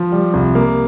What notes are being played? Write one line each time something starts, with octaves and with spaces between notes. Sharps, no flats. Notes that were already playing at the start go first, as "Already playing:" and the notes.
Already playing: F3
G3
C2
A#3